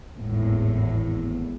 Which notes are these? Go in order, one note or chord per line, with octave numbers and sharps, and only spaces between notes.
G#1 E2 A2